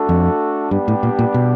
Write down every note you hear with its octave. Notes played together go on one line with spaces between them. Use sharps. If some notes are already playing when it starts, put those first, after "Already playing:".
Already playing: A3 D4 F#4 A4
F2
G2 G3 B3 D4 G4
A2
A#2
A#2
B2